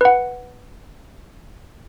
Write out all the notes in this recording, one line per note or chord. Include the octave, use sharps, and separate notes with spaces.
B4 F#5